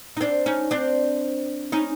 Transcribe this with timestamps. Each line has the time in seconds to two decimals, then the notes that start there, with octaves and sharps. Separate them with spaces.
0.17 D#4
0.21 C4 D4
0.46 C#4 D#4
0.71 C4 D4
1.72 C#4 D#4